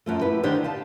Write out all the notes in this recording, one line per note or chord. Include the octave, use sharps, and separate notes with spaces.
F#2 F3 A3
E4 G4 B4
D3 D#3 D4 G4 C5
F5 A5